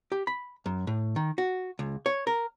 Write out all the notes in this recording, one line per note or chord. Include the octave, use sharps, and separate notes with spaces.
G4
B5
F#2
A2
D#3
F#4
C#2
C#5
A#4